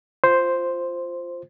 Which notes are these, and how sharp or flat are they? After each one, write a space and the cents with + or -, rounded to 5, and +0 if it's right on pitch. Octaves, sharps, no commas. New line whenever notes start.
F4 +0 C5 +0